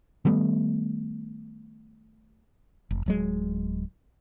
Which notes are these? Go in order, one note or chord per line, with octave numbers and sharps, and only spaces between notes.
D#3 G3 A3 B3
F1
D1 F#3 G#3